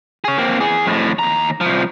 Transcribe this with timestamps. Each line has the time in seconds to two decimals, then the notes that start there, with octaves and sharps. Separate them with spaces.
0.24 G#4 C#5
0.37 A#3 C4
0.60 E3 G#4
0.86 F2 A2
1.19 D#2 A#5
1.61 C2 F3